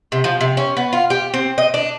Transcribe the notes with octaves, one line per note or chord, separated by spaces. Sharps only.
C3
F3
C3
C#4
B3
F4
G4
C4
D#5
D4